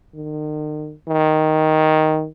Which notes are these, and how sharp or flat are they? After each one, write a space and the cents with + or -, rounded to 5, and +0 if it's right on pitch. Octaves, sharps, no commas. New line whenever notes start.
D#3 -40
D#3 +5